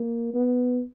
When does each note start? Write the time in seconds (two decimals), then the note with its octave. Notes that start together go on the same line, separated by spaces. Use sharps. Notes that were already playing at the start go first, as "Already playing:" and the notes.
Already playing: A#3
0.34 B3